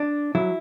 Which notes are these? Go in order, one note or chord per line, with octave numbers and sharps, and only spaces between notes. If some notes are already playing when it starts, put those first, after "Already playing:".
Already playing: D4
F#3 E4